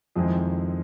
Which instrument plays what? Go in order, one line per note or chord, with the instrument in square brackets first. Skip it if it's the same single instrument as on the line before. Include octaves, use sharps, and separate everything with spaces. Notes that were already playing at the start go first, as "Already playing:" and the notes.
[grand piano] F2 [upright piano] D#3 G#3 C4 E4 G#4